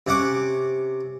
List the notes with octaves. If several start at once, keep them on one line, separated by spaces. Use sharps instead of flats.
C3 C#4 F#5 D6